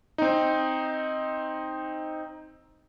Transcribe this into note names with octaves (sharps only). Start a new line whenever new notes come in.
C4 D#4